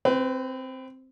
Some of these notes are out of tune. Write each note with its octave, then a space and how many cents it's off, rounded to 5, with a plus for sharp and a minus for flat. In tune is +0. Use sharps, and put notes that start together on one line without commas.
C4 +0 B4 +30